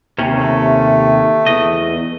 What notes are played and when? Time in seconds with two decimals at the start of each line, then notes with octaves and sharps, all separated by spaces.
0.18 D#2 C3 C#4
0.35 A3
1.47 E2 D#5